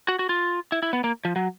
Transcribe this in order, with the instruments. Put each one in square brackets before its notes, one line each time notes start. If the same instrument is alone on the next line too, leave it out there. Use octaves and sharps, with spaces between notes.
[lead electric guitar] F#4
F#4
F4
E4
E4
B3
A#3
F3
F#3